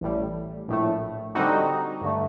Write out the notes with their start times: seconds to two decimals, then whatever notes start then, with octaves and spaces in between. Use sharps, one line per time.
0.01 A1 A2 G3
0.68 A#1 A2 A3
1.35 D3 G3 C4 D#4 F#4
2.01 G2 D3 A3